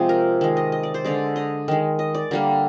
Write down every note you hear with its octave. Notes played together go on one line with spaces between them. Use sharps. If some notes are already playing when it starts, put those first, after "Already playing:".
Already playing: C3 F3 G#3 G4
A#4
D#3 G#3
D#5
D#5
D5
C5
D3 G#3 D5
D#5
D#3 G#3
D#5
D5
D3 G3 A#3 A#4